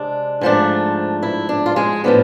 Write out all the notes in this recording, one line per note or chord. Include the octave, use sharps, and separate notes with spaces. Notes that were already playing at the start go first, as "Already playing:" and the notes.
Already playing: C3 G#3 D4
G#2 F3 A3 D4
E4
D4
F4
G#3 G#4
A2 F3 B3 D4